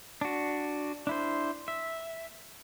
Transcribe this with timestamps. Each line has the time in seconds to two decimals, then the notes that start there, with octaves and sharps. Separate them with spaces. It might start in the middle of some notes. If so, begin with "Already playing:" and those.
0.21 D4 F#4
1.07 D4 E4 C5
1.68 E5